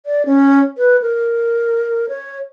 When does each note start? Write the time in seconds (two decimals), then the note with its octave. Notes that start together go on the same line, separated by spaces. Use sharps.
0.06 D5
0.26 C#4
0.78 B4
1.02 A#4
2.09 C#5